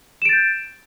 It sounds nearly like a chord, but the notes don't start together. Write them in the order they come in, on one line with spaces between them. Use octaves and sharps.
E7 D7 A6 G6